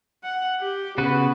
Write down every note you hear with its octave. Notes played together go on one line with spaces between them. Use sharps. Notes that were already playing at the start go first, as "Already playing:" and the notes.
F#5
G4
C#3 B3 F#4 B4